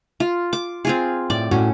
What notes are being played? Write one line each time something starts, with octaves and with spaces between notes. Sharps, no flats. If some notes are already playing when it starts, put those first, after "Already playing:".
F4
D6
C4 F4 G#4
A2 D5
A2 C#4 F#4